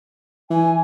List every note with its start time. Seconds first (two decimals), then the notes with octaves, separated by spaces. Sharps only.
0.50 E3 G#5